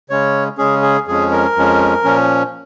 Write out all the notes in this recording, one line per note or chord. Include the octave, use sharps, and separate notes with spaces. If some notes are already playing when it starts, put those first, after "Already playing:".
C#3 G#3 C#4 C#5
C#3 G#3 C#4 G#4
G#4
F2 F3 G#3 C#4 G#4
A#4
F2 F3 G#3 C#4
A#2 F3 C#4